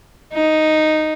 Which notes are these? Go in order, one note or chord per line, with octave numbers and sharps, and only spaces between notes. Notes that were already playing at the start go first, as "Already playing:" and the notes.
D#4